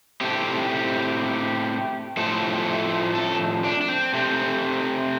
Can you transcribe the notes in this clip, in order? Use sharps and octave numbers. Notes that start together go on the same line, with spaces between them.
A2 A3 C4 G4
A2 F3 A3 C4 A4
A4
D4
D4
C4
C3 A3 C4